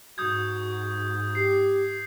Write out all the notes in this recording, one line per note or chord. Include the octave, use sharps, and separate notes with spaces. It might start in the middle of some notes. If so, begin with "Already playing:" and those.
G#2 F#4 D#6 G6 G#6
G4 C7